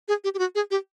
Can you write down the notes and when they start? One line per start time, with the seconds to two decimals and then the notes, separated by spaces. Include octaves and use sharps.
0.08 G#4
0.24 G4
0.34 G4
0.39 F#4
0.55 G#4
0.71 G4